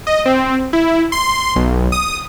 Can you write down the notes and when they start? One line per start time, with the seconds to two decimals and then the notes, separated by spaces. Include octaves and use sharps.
0.07 D#5
0.26 C4
0.73 E4
1.12 C6
1.56 B1
1.92 D#6